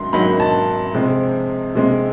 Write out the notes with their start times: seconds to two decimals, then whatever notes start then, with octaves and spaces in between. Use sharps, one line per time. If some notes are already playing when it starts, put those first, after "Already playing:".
Already playing: G#2 D#3 F#3 C6
0.13 G#2 D#3 F#3 A#3 D#4 B5
0.40 A5
0.94 C3 F3 G#3 C4
1.75 C3 F3 G#3 C4